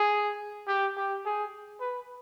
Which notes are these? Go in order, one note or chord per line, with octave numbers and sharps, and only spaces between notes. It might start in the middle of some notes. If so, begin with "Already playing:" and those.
Already playing: G#4
G4
G4
G#4
B4